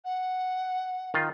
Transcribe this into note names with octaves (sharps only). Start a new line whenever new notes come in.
F#5
D#3 F4